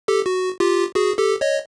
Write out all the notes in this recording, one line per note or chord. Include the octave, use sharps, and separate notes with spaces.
G4 A4
F#4
F4 G4
F#4 G#4
G4 A4
C#5 D#5